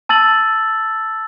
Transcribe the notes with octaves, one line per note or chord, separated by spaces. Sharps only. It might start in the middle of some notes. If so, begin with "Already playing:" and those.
A5 E6 A6 F#7